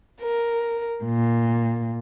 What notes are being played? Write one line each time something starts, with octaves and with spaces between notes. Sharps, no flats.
A#4
A#2